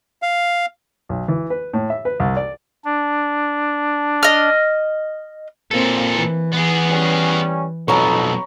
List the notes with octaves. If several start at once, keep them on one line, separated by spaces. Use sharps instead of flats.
F5
B1
E3
B4
A2
E5
B4
C2
D5
D4
D#5 F6
A#2 A#3 C4 A4
E3
B3 G#4
G3 C#4
B1 F2 B2 D#4 A4 C#5 A#5 B5